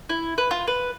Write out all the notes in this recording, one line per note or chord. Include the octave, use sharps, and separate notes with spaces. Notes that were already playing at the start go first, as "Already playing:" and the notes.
E4
B4
F4
B4